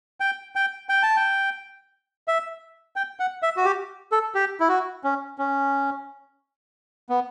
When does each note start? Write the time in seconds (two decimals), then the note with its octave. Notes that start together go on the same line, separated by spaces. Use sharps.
0.20 G5
0.55 G5
0.89 G5
1.03 A5
1.17 G5
2.28 E5
2.96 G5
3.20 F#5
3.42 E5
3.57 F#4
3.65 G4
4.12 A4
4.35 G4
4.60 E4
4.69 F#4
5.04 C#4
5.38 C#4
7.09 B3